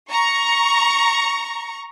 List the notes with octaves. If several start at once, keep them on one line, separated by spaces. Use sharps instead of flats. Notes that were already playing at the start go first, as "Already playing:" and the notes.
A#5 C#6